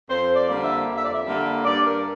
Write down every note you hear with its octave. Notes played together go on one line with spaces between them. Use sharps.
F2 C5
D5
D3 G3 A#3
E5
F2
E5
D5
E5
D3 G3 A#3
G2 D5
A#4